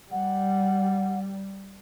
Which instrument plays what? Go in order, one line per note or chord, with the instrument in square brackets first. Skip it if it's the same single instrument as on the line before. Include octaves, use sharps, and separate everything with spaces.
[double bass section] G3 [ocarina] F#5